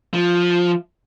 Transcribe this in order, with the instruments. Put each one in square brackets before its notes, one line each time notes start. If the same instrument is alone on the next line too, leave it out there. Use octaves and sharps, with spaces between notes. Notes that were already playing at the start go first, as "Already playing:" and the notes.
[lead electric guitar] F3